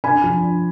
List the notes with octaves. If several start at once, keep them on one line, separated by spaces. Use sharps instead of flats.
D4 G#5 B5
F3
D4